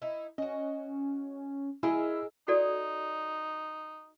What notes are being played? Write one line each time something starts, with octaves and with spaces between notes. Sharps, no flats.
D#4 E4
C#4 F#4 D#5
E4 G#4 A#4 D#5 E6
D#4 F#4 A4 D5